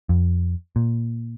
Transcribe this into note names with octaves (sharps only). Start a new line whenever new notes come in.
F2
A#2